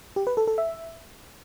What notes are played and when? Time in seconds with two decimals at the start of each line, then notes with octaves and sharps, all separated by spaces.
0.16 G4
0.27 B4
0.37 A4
0.47 A4
0.58 E5